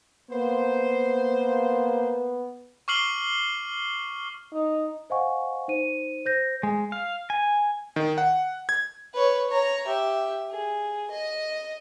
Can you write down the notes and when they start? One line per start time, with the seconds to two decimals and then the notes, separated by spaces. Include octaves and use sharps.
0.31 A#3 B3 C5
2.88 C#6 D6 F6 C7 F#7 G7
4.53 D#4
5.10 C5 D#5 F5 F#5 G#5 C#6
5.68 D#4 C5 D#7
6.26 C5 G6 A#6
6.63 G#3
6.92 F5
7.30 G#5
7.96 D#3
8.18 F#5
8.69 G#6
9.14 B4 C#5
9.49 C#5 A#5
9.87 G4 E5
10.50 G#4
11.11 D#5